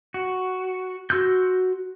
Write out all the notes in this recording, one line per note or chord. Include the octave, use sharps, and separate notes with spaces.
F#4
F#4 C6 E6 F#6 G6